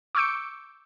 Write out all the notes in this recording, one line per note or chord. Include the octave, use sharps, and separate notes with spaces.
C#6 D6 E6 G6 C#7 D7